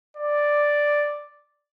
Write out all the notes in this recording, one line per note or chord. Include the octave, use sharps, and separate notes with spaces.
D5